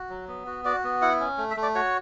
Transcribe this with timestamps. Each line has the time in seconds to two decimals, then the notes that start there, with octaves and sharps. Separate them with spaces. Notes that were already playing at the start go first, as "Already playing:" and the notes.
Already playing: F#4
0.10 F#3
0.28 B3
0.47 F#4
0.65 F#4 D5
0.84 B3
1.01 E4 F#5
1.20 C#4
1.38 A3
1.51 E5
1.57 A3
1.62 D5
1.75 F#4 C#5